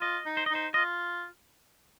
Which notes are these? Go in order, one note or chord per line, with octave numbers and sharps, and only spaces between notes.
F4 D#5
D#4
C5
D#5
D#4
C5
F4 D#5